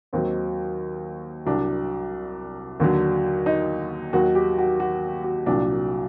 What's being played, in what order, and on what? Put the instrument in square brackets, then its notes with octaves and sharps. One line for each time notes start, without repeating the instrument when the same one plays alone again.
[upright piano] D#2 D#3 F#3 C4
C2 C3 F#3 D4
D#2 D3 F#3
D#4
D#2 D#3 F#3 F#4
G4
F#4
F#4
F#4
C2 A#2 F#3 D4